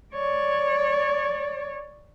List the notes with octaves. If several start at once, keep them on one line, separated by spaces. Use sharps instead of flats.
C#5 D5